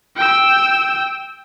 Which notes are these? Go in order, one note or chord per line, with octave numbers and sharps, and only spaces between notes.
G5 E6